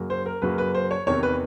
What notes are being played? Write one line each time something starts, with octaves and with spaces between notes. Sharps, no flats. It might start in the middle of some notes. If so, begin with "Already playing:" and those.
Already playing: F#2 C#3 F#3 A#3
C5
A#4
F#2 C#3 F#3 A#3 B4
B4
C5
C#5
E2 C3 D#3 C#5
B4